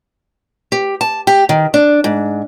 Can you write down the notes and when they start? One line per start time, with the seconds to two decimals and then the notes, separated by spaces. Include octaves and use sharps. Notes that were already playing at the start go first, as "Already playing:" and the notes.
0.72 G4
1.01 A5
1.27 G4
1.49 D#3
1.74 D4
2.04 G#2